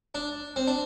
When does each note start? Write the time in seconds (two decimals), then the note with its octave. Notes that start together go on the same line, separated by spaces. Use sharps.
0.15 D4
0.56 C4
0.67 D4